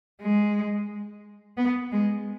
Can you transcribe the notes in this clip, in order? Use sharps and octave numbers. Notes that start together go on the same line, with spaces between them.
G#3
B3
G#3